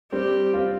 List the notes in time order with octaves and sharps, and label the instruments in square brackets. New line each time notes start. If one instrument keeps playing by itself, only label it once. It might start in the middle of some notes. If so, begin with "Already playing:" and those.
[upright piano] G3 C4 [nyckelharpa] G4
[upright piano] C4 F4